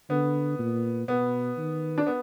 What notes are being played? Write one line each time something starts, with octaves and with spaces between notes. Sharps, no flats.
D3 B3
A#2
B2 B3
D#3
D4
B3